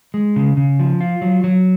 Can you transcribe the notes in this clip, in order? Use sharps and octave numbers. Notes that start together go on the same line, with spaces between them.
G#3
C#3
C#3
F3
F4
F#3
F#3